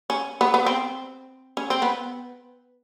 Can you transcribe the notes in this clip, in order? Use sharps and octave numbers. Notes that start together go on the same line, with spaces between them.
C#4
B3
B3
C4
C#4
C4
B3